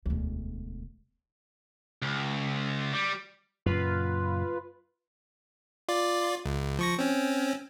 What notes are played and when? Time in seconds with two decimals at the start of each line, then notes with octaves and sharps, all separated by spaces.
0.06 E1 D2
2.02 C#2
2.93 G3
3.66 F#2 A#2 C#3 F4 B4
5.88 F4 D5
6.45 C#2
6.79 F3 C#6 A#6
6.99 C4 C#4